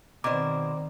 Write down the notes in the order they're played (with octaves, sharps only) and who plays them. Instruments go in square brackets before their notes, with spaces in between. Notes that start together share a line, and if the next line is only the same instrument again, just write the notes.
[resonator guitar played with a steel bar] B2 C5 [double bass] D#3 C4 [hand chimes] D5 A#5 [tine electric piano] D6